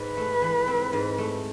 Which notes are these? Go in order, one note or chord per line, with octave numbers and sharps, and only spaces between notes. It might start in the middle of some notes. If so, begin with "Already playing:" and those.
Already playing: G#2 B4
A3
E3
C4
G#2
A3